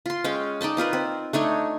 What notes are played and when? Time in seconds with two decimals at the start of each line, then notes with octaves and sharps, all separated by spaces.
0.06 F4 C6
0.24 G#3 C#4 F5 G5
0.61 D#4 D5 G5 A5
0.77 C4 F4 A#4 B4
0.93 C4
1.33 A3 D4 D#4 C#5